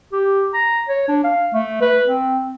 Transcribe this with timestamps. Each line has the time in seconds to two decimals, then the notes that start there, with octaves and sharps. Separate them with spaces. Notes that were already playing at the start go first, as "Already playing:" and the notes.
0.12 G4
0.54 A#5
0.89 C#5
1.08 D4
1.24 F5
1.54 A3
1.81 B4
2.06 C4